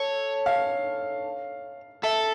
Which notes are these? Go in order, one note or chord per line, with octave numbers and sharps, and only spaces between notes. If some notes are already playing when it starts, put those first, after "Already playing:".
Already playing: A4 C#5
F5
A4 E5